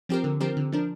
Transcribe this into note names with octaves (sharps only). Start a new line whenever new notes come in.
F3 C4 G4 A#4
D3
F3 C4 G4 A#4
D3
F3 D4 A#4